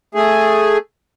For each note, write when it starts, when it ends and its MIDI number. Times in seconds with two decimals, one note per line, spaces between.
0.15 0.78 57
0.15 0.78 68